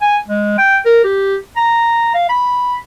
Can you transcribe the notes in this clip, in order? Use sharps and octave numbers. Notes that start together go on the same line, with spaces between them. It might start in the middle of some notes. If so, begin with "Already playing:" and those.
G#5
G#3
G5
A#4
G4
A#5
F5
B5